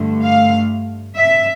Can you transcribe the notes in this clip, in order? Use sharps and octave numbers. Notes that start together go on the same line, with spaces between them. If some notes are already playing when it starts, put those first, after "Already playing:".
Already playing: G2 D3 A3
F5
E5